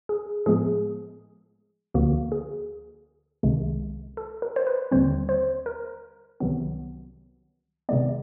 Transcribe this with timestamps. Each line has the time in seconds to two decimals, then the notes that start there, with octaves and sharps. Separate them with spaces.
0.09 G#4
0.46 A2 F3 G#3 B3 G#4
1.94 D2 D3 F3 A#3 F#4
2.32 G#4
3.43 C2 C3 D#3 G#3
4.17 A4
4.42 A#4
4.56 C5
4.67 B4
4.91 D#2 D3 G3 C4 C5
5.29 C5
5.66 A#4
6.40 C2 C3 D#3 F#3 B3
7.89 C3 D#3 G#3 B3 D5